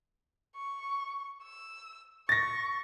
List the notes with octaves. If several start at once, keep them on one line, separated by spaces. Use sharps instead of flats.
C#6
E6
C#6 A6 A#6